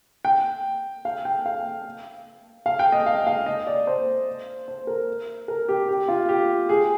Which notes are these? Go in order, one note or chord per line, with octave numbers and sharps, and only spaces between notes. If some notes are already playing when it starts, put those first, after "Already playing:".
G5
F5
G5
F5
F5
G5
D#5
F5
F5
D#5
D5
C5
C5
A#4
A#4
G4
G4
F4
G4
G#4